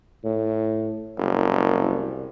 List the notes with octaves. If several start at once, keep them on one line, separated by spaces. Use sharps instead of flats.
A2
F#1 C2